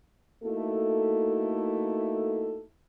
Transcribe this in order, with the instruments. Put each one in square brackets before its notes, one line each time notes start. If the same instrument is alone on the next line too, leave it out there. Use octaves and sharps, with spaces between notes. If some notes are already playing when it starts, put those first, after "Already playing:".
[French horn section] A3 A#3 D#4 E4 F#4 A4